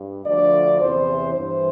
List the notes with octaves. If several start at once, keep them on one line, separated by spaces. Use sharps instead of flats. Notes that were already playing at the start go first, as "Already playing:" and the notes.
Already playing: G2
D2 D3 F3 D5
E2 C3 E3 C5
G2 E3 C5